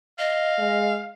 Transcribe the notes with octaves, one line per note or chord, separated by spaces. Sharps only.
D#5 F5
G#3